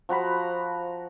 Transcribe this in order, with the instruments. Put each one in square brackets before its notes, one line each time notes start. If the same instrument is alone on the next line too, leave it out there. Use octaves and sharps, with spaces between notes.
[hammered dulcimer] F3 F#4 A#5 B5